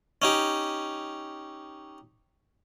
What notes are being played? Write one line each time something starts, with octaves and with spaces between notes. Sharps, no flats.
C#4 D#4 G4